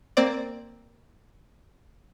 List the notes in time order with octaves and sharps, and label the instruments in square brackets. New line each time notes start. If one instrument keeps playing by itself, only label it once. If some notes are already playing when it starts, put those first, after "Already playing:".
[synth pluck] A#3 C4 C5 D5